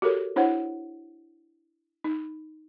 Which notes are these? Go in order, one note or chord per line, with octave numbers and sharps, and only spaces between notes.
F#4 G4 A4 A#4 C#5
D4 E4 C5 C#5 F#5
D#4